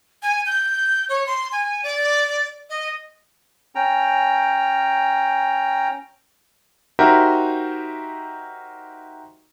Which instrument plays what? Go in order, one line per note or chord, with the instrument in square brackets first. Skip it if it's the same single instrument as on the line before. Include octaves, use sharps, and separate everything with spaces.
[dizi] G#5
G6
C#5
C6
G#5
D5
D#5
[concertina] C#4 G5 A#5
[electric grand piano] D#4 F#4 G4 A#4 C5 E5